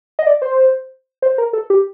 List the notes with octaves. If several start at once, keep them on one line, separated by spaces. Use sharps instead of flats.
D#5
D5
C5
C5
A#4
A4
G4